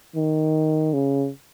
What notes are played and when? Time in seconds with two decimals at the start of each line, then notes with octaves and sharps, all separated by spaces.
0.15 D#3
0.93 C#3